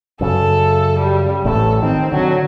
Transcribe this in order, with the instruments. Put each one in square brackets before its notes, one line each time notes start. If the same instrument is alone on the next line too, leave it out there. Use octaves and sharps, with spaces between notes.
[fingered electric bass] F#2 C#3 [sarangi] A4
[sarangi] G3
[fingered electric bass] A1 A2 [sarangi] A4
[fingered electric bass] D#3 [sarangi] C4
[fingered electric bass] D3 [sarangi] F#3